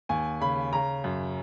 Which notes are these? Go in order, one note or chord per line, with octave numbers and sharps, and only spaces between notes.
D#2 G#5
C#3 B5
C#3 A#5
F#2